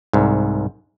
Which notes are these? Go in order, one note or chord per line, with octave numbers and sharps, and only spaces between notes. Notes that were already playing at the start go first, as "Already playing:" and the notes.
C2 G#2